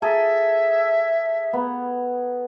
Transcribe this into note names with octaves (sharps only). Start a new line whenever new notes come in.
G#4 A4 E5 A5
B3